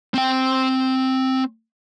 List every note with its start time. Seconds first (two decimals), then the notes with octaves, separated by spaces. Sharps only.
0.14 C4 G5